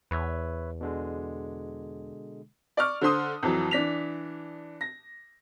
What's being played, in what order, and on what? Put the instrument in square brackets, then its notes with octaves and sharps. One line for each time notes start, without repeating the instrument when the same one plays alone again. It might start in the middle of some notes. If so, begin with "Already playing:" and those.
[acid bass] E2 [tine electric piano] B4 C#5 E5
[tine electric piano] B2 D3 G#3
[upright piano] D5 C#6 F6
D3 C5 C6 D#6
F2 E3 F#3
E3 D4 B6 F7
A#6